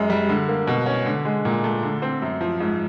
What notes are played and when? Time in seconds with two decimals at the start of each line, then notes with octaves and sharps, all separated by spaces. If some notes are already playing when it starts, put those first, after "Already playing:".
Already playing: F#2 G#3
0.10 G3
0.29 D3
0.48 A#3
0.67 B2
0.86 C#4
1.06 D3
1.25 G#3
1.45 A#2
1.64 A3
1.83 D3
2.02 C4
2.22 F#2
2.41 F3
2.60 G#2